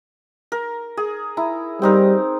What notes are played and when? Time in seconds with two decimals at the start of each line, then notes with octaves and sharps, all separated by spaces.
0.52 A#4
0.97 G#4
1.37 E4 A#5
1.82 G3 C4 D#4 A#4